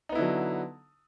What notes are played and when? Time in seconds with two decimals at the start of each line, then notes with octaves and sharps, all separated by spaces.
0.09 D#4
0.12 B3
0.15 E4
0.18 D3
0.21 F#3